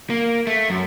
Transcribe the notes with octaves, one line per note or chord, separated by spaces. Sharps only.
A#3
A3
F#2